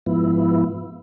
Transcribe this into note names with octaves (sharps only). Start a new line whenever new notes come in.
G#2 F3 B3 E4